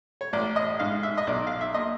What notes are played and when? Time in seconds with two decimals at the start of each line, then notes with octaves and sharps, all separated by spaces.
0.21 C#5
0.33 A1 D5
0.56 D#5
0.79 G#2 F5
1.03 E5
1.18 D#5
1.27 B1 D5
1.47 F5
1.61 E5
1.74 A#2 D#5